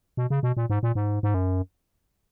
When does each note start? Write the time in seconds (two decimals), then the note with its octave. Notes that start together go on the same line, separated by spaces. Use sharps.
0.17 B2
0.30 C#3
0.43 B2
0.57 A#2
0.70 G#2
0.83 A#2
0.95 G#2
1.23 G#2
1.34 F#2